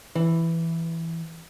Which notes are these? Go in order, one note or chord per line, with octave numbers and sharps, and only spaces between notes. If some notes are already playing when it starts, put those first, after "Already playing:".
E3